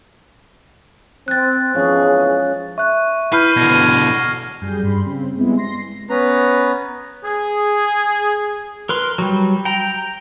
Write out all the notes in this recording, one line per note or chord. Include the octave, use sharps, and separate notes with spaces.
C4 F#6 A6
E2 G#2 F3 G#3 C#4 G#4
E5 C#6 F#6
E4 B4 B5 F6 G6 C7 D#7
B2 D3 G#6 A#6 D#7
F#2 G3 G#4 G6
G2 G3 B5 C6
C#3 C4
G3 G#3 B3 C4 E4
C6 A#6 C7
B3 C#4 B4 A#5
G#4
A#4 B4 C6
F#3 G3
G5 A#5